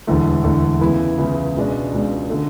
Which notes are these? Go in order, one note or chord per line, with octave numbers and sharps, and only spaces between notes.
E1 E2 D3 A3
E1 E2 D3 A3
C#2 C#3 E3 B3 E4
C#2 C#3 E3 B3 E4
C#2 B2 G#3 D4
C#2 B2 G#3 D4
D3 A3 D4 A4